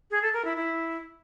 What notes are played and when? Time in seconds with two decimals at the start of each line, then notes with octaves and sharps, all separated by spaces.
0.11 G#4
0.22 A4
0.33 A#4
0.45 E4
0.56 E4